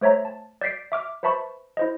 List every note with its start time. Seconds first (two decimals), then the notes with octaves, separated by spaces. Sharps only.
0.01 A3 C5 C#5 E5 A#5
0.25 A5
0.61 D5 G6 B6 C7 D7
0.92 E5 D6 F6
1.23 B4 C5 E5 A5 B5 C#6
1.77 E4 C5 D#5